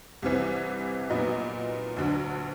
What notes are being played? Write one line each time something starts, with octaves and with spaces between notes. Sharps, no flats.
C2 C3 E3
A#2 F#3 B3 D#4
D2 D3 F#3